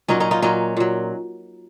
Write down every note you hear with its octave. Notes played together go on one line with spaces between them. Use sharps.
A#2 F#3 C#4 D#4
C#4 D#4
D#4 F4
A#2 F#3 C#4 D#4
A#2 F#3